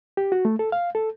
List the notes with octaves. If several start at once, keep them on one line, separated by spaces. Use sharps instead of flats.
G4
F#4
A3
A4
F5
A4